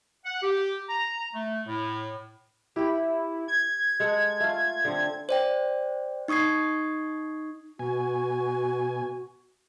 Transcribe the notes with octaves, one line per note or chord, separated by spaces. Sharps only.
F#5
G4
A#5
A3
A2
E4 G4 G5
G#6
G#3 A4 F#5
A3 F4
D3 C4
C5 D5 G5
D#4 C#6 D#6 G#6 C7
B2 F#4 G#5